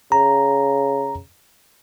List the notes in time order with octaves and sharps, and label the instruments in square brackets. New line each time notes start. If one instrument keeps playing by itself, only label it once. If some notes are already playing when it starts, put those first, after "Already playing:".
[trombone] C#3 [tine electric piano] A#5